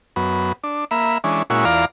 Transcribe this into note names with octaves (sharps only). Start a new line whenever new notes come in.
F#2 B3
D4
A#3 E5 B5
E3 G#3 C#4 D4
A#2 G#3 C#4 E4 F#4
E2 F4 D5 F5 A#5